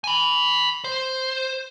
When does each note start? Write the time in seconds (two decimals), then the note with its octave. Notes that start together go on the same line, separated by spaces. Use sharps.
0.04 G#5 B5
0.84 C5